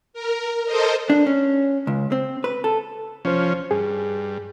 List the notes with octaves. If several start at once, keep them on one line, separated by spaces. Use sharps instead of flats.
A#4
A4 A#4 C5 D#5
D4
C#4
C#2
C4
B4
A4
C2 F3 C#4 C5
G2 G#4